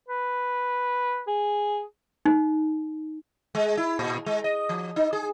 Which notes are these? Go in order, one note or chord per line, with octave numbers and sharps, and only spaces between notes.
B4
G#4
D#4
G#3
E4
A#2
G#3
D#5
F3
D#4
G#4